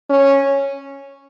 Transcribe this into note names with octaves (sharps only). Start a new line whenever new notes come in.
C#4